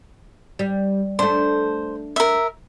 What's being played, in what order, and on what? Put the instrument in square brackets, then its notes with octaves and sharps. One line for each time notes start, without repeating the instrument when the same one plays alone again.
[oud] G3
[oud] A3 D4 [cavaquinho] C5
[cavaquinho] A#4 E5